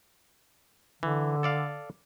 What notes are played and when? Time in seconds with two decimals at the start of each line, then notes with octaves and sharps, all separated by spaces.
1.03 D3 E3
1.43 A4 D5 F5